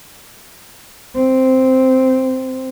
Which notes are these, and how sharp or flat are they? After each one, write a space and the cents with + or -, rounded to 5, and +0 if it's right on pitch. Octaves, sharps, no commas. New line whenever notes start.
C4 -5